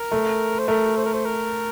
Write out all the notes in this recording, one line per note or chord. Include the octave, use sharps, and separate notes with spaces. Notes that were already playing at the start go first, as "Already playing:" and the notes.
Already playing: A#4
A3
C5
A3 A#4
C5
A#4
C5
A#4